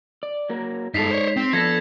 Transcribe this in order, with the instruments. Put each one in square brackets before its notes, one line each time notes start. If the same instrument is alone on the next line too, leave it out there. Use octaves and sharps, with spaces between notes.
[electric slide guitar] D5
F#3 A#3 A#4
[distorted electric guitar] G2 A4 [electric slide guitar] G#3 D#4 [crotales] B6 C7 F7
[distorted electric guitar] C5 C#5
C4
[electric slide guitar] F3 B3 D4 [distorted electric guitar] A4 [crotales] G#6 A#6 B6